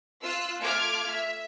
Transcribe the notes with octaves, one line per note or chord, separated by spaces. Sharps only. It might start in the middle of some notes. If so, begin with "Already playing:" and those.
F4 E6 F#6
A3 F4 D6 F6 G#6
E5